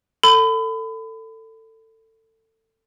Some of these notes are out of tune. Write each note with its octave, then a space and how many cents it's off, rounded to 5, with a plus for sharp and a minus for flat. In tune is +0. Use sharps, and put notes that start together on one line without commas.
A4 +25 B5 +35